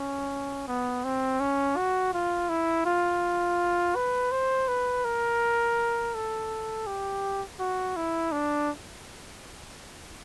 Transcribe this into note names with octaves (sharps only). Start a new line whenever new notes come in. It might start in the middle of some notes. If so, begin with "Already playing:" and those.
Already playing: C#4
B3
C4
C#4
F#4
F4
E4
F4
B4
C5
B4
A#4
A4
G4
F#4
E4
D4